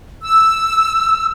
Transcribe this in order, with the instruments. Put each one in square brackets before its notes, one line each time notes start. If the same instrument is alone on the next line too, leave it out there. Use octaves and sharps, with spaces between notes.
[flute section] E6